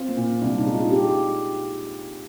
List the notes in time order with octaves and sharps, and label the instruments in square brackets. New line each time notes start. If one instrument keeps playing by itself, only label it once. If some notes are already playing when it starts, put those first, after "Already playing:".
Already playing: [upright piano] C4 F4
[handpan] A#3
[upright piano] A#2
[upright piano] C2 [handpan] D4
[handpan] D#4
[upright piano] G#3
[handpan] F4
[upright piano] G#3 [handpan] G4